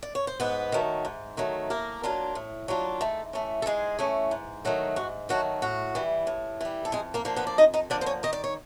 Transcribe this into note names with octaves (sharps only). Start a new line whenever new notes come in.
D5
C#5
C5
G#2 B3 B4
D#3 F#3 A3
G#2
D#3 F#3 A3
A2 A#3 A#4
F#3 A#3 D4 F4
A2
F#3 A#3 D4 F4
G#2 A3 A4
E3 A3 C#4
A4
G#2 G#3 G#4
E3 A3 C#4
G#2
D#3 F#3 A3
G#2 F#4
D#3 F#3 A3 F#4
A2 F#4
E3 G3
A2
E3 G3
A4
F2 G#3 G#4
A#3 A#4
D3 F3 A#3
B3 B4
D5
F2 D#4 D#5
D#4 D#5
D3 F3 A#3 D4 D5
C5
C#4 C#5
D#3 D#5
D5
C#5